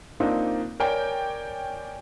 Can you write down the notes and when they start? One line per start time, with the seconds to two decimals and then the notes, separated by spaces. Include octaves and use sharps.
0.20 A#3 C4 D4 D#4 F4
0.80 A#4 C#5 D5 G5 G#5